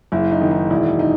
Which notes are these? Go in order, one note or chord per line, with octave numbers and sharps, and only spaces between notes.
F#1 E4
D#4
D#3
D#4
E1 E4
D#4